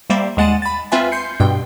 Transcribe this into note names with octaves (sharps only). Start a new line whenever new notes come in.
G3 A#3 C5 D5 E5
D#2 G#3 F#5 A6 D#7 E7
B5 A6
C4 F4 B4 E5 G#5
C6 G6 C7 C#7
G2 B2 G5